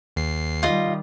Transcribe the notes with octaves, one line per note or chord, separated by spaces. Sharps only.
D#2 C7
D#3 G3 F4 D#5